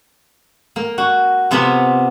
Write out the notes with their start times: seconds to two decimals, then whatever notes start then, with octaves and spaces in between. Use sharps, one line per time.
0.76 A#3
0.98 F#4
1.51 C3 B3 F4 G#5 B5